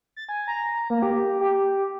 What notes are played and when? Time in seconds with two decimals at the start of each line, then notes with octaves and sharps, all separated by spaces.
0.16 A6
0.29 G#5
0.48 A#5
0.90 A#3
1.02 G4
1.41 G4